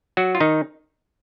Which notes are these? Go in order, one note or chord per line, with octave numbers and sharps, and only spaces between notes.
F#3 F#4
F4
D#3 D#4